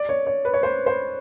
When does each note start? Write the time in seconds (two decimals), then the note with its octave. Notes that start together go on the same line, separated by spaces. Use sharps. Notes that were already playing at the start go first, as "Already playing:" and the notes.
Already playing: D5
0.09 C#5
0.27 C#5
0.45 B4
0.54 C#5
0.63 C5
0.86 C5